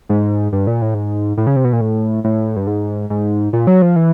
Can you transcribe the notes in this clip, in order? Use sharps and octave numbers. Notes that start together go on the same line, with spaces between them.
G#2
G2
A#2
A2
G#2
A2
C#3
C3
B2
A#2
A2
A2
G2
G#2
G#2
A#2
F#3
F3
E3